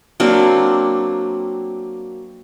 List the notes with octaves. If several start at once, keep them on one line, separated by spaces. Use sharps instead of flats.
F#3 A#3 C4 D4